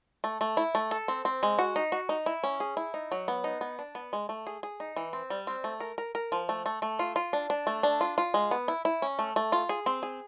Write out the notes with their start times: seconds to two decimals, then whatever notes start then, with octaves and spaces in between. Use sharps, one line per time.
0.24 A3
0.41 A3
0.57 E4
0.75 A3
0.91 A4
1.08 C4
1.25 C4
1.43 G#3
1.59 F#4
1.76 D#4
1.92 F#4
2.09 D#4
2.26 E4
2.44 C#4
2.60 G#4
2.77 E4
2.94 D#4
3.12 F#3
3.28 B3
3.44 D#4
3.61 B3
3.79 D4
3.95 B3
4.13 G#3
4.29 A3
4.47 G#4
4.63 G#4
4.80 D#4
4.96 E3
5.13 C4
5.30 G3
5.47 C4
5.64 A3
5.80 A#4
5.98 A#4
6.15 A#4
6.32 F3
6.49 A3
6.66 A3
6.82 A3
6.99 F4
7.16 F4
7.33 D4
7.50 D4
7.67 A3
7.83 D4
8.01 F4
8.18 F4
8.34 G#3
8.51 B3
8.68 E4
8.85 E4
9.02 C#4
9.19 A3
9.36 A3
9.52 F4
9.69 G#4
9.86 C4
10.03 G#4